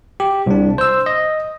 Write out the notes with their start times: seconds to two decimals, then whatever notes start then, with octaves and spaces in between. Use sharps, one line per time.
0.20 G4
0.46 C2 D4
0.78 C5 E6
1.06 D#5